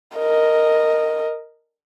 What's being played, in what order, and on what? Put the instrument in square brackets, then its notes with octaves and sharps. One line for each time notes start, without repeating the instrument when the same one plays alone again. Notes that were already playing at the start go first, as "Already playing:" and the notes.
[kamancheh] A#4 D#5